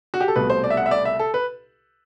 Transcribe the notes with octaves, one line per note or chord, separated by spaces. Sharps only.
F#4
G4
A4
C2 B2 A3 B4
C5
D5
E5
F#5
E5
D5
E5
A4
B4